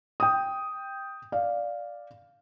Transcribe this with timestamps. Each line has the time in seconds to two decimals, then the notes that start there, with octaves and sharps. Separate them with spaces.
0.20 G5 D#6
1.32 D5 F5